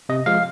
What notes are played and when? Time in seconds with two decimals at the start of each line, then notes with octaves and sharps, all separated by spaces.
0.09 C3 D#5
0.26 F3 G#3 F5